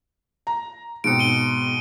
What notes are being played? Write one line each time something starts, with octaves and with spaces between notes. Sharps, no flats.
A#5
G#2 B2 C4 C#7 D7
D#7 G7